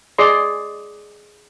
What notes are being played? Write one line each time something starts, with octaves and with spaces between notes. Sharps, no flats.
G#4 D5 D#5 C6